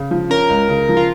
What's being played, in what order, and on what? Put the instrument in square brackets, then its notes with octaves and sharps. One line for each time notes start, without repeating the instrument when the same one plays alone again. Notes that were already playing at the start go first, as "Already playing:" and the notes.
Already playing: [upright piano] C#3
F3
[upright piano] C#4 [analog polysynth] A#4
[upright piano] C#2
C#3
F3
[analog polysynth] F4